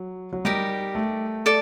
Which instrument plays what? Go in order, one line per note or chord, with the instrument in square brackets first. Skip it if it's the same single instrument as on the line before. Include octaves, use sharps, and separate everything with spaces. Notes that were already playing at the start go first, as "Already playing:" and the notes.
Already playing: [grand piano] F#3
F#3
[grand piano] G3 [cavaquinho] D#4 G4 A#4
[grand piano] A3
[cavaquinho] A4 D5